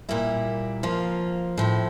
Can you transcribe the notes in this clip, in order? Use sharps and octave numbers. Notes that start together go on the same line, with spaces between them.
A#2 G3 A#3 E4
F3 A#3 F4
A2 F3 C4